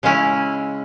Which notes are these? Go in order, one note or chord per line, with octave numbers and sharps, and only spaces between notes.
C#3 G#3 C#4 E4